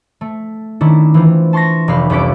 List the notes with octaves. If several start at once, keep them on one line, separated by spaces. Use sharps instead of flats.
A3
D#3 C#4 D4 E4
E3 C4 F4
A5 C6 C#6 A6 A#6
F1 G4 F5 B5
F1 C2 C#4 D5 B6 D7